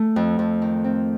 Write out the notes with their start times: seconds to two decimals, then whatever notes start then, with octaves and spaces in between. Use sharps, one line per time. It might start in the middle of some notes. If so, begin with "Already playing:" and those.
Already playing: A3
0.16 F2
0.39 F2
0.62 D#3
0.84 C4